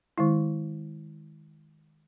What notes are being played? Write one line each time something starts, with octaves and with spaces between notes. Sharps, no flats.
D#3 G#3 E4